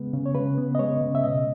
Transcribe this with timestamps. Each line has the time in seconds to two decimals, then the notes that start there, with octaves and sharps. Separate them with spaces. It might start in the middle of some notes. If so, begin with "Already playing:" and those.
Already playing: C#3 G#3 B3 B4
0.13 C#3
0.26 C#5
0.35 C#3 B4
0.58 B3
0.75 D#5
0.79 G#3 C#5
1.01 C#3
1.15 E5
1.24 B2 D#5